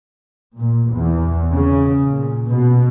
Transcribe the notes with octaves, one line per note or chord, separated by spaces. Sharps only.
A#2
E2
C#3
A#2
B2